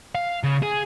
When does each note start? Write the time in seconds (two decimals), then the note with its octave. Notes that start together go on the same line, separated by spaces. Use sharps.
0.15 F5
0.43 C#3
0.62 G#4